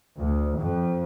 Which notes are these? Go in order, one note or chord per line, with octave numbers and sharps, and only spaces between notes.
D2
F2